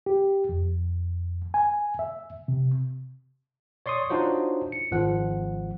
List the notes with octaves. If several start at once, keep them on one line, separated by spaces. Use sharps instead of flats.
G4
F2
G#5
E5
C3
C#5 D5 C6 C#6 D#6
D4 D#4 F4 F#4 C5 C#5
C#7
G#1 F3 F#5